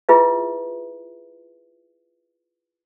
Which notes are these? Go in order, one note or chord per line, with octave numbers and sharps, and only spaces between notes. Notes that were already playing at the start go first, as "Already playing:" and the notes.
E4 F4 G#4 B4 D#5 E5